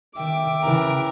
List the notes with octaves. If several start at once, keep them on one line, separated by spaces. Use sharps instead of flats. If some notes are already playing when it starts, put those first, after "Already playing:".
D#3 E5 G5 D6
C#3 E3 A#4